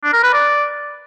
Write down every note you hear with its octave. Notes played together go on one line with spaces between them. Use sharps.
D4
A#4
B4
D5